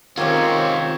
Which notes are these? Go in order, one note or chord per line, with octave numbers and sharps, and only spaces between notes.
D#3 G#3 C4 C#4 F4 G4 C#5